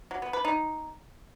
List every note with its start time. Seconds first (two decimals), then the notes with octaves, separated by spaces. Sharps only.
0.11 F#3
0.22 B3
0.33 B4
0.45 D#4